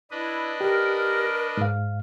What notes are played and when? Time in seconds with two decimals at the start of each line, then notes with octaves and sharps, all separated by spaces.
0.11 D4 E4 B4 D#5
0.61 G4 A#4
1.57 G#2 F5